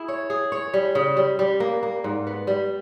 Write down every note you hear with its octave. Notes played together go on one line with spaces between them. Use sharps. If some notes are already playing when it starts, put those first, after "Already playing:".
Already playing: E4 G#4
C#5
G#4
C#5
G3
C#3
G3
G3
A#3
A#3
G#2
B3
G3